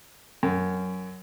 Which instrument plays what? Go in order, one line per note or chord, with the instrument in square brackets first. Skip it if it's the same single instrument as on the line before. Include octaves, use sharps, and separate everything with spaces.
[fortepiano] F#2